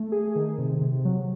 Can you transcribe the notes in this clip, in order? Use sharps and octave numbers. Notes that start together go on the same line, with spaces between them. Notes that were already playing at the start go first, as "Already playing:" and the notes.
Already playing: A3
G#4
D#3
C3
C3
F#3